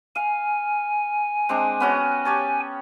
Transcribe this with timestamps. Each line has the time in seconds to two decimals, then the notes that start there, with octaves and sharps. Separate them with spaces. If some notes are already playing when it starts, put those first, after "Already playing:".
0.16 F5 G#5
1.49 G#3 C4 D4
1.80 B3 C#4 F#4
2.25 G4 C#5 A5